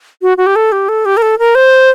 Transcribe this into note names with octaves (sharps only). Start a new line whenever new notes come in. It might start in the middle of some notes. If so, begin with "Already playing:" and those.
F#4
F#4
G4
A4
G4
A4
G4
A#4
A4
A#4
C5